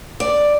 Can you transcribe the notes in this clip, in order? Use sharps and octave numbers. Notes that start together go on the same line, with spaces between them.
D5